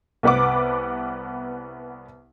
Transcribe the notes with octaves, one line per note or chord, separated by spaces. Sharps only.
C2 B3 B4 F#5 D6